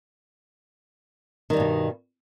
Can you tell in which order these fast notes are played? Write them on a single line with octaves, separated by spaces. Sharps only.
D#3 G3 G2 B2